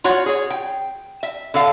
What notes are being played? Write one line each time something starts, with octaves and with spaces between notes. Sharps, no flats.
F4 F#4 C#5 F#5
G#4 C#5
G5
E5
D3 A4 F5